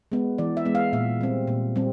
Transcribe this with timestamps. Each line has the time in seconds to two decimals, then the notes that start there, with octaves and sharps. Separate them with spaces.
0.12 G#3 B3
0.38 E3 D5
0.57 E5
0.66 G#3 B3
0.75 F5
0.93 A#2 E5
1.21 G3 C4
1.47 A#2
1.76 G3 C4